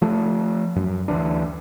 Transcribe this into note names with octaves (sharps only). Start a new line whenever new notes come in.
F3 A3
F#2
D2 E3 D4